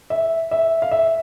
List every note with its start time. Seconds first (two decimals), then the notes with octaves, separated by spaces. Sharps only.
0.10 E5
0.51 E5
0.82 F5
0.91 E5